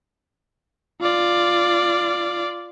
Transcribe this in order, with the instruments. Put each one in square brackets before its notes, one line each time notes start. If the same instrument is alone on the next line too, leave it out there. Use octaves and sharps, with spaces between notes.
[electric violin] F4 D5